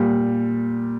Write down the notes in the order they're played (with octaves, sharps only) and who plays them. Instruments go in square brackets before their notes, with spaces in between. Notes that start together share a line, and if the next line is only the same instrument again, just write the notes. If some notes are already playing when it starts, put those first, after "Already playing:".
Already playing: [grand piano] A#2 G3